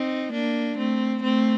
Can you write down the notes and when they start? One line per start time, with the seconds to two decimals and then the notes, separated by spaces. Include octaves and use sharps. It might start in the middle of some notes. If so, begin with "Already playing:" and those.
Already playing: C4 D#4
0.33 A#3 D4
0.78 A3 C4
1.23 A3 C4